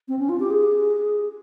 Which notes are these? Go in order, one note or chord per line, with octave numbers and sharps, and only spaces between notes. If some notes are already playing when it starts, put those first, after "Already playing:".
C4
C#4
F4
G4
G#4